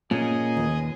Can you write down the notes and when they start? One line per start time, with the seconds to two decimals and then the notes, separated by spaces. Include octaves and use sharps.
0.11 A#2 C#4 G#4 D#5 G#5
0.57 D#2 B4